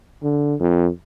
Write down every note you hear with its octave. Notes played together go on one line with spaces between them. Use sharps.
D3
F2